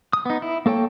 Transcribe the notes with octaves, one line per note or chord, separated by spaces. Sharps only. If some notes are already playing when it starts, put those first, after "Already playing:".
D#6
B3 D#4
E4
A#3 A4 C#5 G5